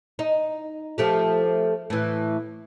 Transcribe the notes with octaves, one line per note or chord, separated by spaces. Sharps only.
D#4
F3 A3 G4
A2 E3